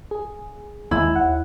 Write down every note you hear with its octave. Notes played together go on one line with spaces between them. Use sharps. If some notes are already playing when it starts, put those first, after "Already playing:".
G#4
D#2 D#3 G#3 E4
D#2 F#5